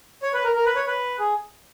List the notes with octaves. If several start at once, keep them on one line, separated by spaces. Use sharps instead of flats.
C#5
B4
A#4
A#4
B4
C#5
B4
G#4